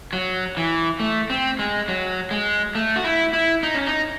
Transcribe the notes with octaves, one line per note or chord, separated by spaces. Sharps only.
F#3
E3
A3
C4
G#3
F#3
G#3
A3
F#4
E4
E4
D#4
C#4
D#4